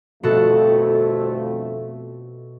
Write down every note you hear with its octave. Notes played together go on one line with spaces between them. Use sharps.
G1 F2 B2 A3 F#4 A4